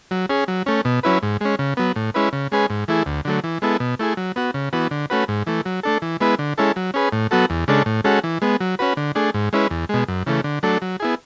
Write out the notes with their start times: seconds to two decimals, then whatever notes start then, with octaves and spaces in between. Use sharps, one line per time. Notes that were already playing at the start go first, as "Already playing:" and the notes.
0.11 F#3
0.30 C#4 G#4
0.48 F#3
0.66 A3 C#4
0.85 B2
1.03 F#3 C#4 E4 B4
1.22 G#2
1.41 G#3 C#4
1.59 C#3
1.77 F#3 B3
1.96 A2
2.14 G#3 C#4 E4 B4
2.33 C#3
2.52 G#3 C#4 G#4 B4
2.70 G#2
2.88 E3 A3 E4 G#4
3.06 D2
3.25 D3 F#3 A3
3.44 E3
3.62 G#3 B3 E4 A4
3.80 B2
3.99 A3 E4 G#4
4.17 F#3
4.36 B3 F#4
4.54 C#3
4.73 E3 B3 F#4
4.91 D3
5.10 A3 C#4 F#4 B4
5.28 G#2
5.47 E3 A3
5.65 F#3
5.83 A3 D4 A4
6.02 E3
6.20 G#3 B3 E4 B4
6.39 D3
6.58 G#3 C#4 E4 A4
6.76 F#3
6.94 C#4 G#4 B4
7.12 A2
7.31 F#3 B3 F#4 A4
7.50 E2
7.68 C#3 G#3 D4 A4
7.86 A2
8.04 G#3 C#4 F#4 A4
8.24 E3
8.42 G#3 B3
8.61 F#3
8.79 C#4 F#4 B4
8.97 D3
9.15 A3 D4 G#4
9.34 G#2
9.53 G#3 C#4 E4 B4
9.71 E2
9.89 B2 G#3
10.08 F#2
10.27 C#3 E3 A3
10.44 D3
10.63 F#3 A3 D4 A4
10.82 F#3
11.00 B3 E4 G#4